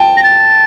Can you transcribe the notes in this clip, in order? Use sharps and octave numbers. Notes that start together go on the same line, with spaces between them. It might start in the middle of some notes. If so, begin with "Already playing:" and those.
Already playing: G5 A5
A#6
A6